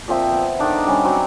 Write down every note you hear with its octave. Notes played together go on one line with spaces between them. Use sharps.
A#2 F3 C4 E5
B3
D3 D#3 D4 D#4
G3 C#4
F#3 C4 D5